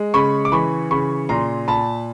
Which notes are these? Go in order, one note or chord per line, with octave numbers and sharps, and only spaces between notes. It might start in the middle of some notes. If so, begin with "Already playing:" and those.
Already playing: G#3
C#3 B5 C#6
D6
E3 B5 C#6
C#3 B5 C#6
A#2 A#5 C6
A#2 A5 B5